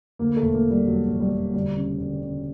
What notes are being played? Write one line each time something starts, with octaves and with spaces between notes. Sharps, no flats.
D2 A#3
A3
E1
A#3
C3
G3
E1 F#3
E1
G3
E1
D2 G3
C#3
D2
C#3